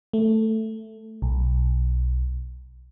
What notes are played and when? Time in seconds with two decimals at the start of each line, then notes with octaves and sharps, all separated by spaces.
0.13 A3
1.22 B1